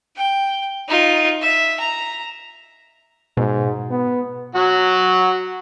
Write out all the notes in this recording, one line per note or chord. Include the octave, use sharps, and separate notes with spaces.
G5
D#4 F4
E5
A#5
G#2 B2
B3
F#3 F#4